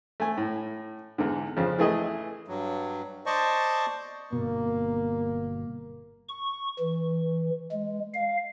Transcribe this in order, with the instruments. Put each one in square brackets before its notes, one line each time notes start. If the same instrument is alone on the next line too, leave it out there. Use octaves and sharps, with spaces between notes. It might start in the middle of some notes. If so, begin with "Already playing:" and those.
[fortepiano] A3 G#5
A2
E2 G#2 D3
F2 C#3 F3
E3 A3 G#4 D#5
[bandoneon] G2 F#3
C5 D5 D#5 A5 C#6
[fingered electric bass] G1 B2 [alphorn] A#3
[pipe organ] C#6
E3
G#3
F5